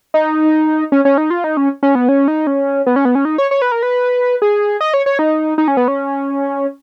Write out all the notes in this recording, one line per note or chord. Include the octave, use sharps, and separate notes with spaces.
D#4
C#4
C#4
D#4
F4
D#4
C#4
C#4
B3
C#4
D#4
C#4
B3
C#4
B3
C#4
D#4
C#5
C#5
B4
A#4
B4
G#4
D#5
C#5
C#5
D#4
D#4
C#4
B3
C#4